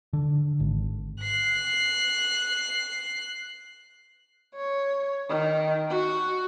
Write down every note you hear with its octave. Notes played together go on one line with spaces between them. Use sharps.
D3
G#1
F#6 C7
C#5
D#3
F#4